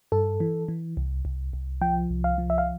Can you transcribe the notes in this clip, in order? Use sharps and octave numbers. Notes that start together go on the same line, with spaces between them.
G2 A4
E3
E3
C2
C2
C2
F3 G5
C2
F5
F3
E5
F5